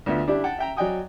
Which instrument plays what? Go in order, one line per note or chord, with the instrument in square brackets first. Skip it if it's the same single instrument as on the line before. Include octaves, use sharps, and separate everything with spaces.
[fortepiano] D2 B3 F4 E5
G3 D4 E4 G4 D5
F#5 G5 A5
E5 G5 A#5
F#3 D5 D#5 G5 G#5 D#6